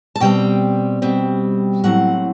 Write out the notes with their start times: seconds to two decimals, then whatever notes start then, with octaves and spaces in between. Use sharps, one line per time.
0.15 A5
0.20 B2 G3 C4 G5
1.02 B2 G3 C4
1.84 A2 F#3 C4 F#5